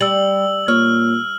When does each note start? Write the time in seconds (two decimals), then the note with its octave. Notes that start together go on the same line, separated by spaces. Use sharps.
0.01 G3 E6 F#7
0.68 A#2 C#5 F6